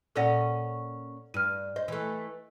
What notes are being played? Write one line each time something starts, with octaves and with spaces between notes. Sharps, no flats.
A#2 C#4 A4 D5 D#5 F#5
G2 F6 D#7
C5 D#5
E3 A3